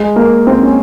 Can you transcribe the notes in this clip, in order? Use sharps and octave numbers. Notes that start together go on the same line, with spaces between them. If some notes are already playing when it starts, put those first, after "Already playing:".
Already playing: G#3
A#3
C4
C#4